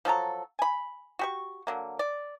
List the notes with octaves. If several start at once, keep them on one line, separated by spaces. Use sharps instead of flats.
F3 F#3 A4 A#5
G#5 B5
F#4 G4 C#6
D3 F#3 A#3
D5